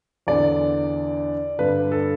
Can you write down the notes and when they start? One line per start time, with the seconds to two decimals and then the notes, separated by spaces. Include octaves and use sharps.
0.27 E2 D3 D5
1.59 G2 D3 B4
1.92 A4